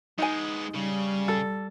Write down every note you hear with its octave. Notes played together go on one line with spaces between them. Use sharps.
G#3 B3 D#4 G#5
C#3 G3
A4